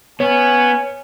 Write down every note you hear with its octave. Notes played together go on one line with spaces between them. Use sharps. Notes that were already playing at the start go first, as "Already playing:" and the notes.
B3 C#4 C#5 G#5